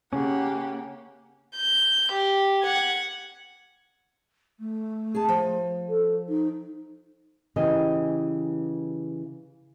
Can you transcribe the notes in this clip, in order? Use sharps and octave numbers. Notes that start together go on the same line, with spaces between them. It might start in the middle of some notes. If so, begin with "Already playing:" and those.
C#3 A#3 C#4 G4 F#5
G6
G4
F#5 G#6
A3
G#4 A5
F3
A4
D#4
C#3 E3 G4 D#5 G#5